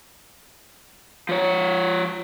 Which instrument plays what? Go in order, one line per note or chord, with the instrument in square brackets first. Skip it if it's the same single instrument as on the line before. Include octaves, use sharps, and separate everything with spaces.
[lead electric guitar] F3 C#5